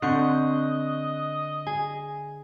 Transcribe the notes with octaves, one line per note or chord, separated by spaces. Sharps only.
D3 C4 D#5 C#6 F#6
G#4 G#5